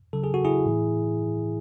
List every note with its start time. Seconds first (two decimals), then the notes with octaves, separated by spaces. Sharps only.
0.13 C#3 F#3 A4
0.24 G#4
0.34 F#4
0.45 E4 G#4
0.66 A2 E3